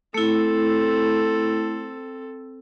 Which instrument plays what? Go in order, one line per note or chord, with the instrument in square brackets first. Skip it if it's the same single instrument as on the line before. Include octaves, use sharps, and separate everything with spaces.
[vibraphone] A3 E4 [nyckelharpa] C4 A4